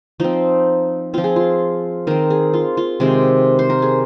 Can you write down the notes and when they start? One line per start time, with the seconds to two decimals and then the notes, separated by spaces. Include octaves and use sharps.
0.20 F3 C4 D#4
1.14 F3 C4 F4
1.24 G#4
1.36 F4
2.07 D#3 C4 A#4
2.30 G#4
2.54 F4
2.77 F4
3.00 C3 D#3 G#3 C4
3.59 C5
3.70 A#4
3.82 G#4